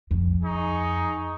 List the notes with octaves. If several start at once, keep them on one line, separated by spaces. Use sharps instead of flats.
F2
D#4 G#4 C#6